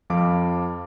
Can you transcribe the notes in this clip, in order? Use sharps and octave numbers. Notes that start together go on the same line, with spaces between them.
F2 F3 F5 D6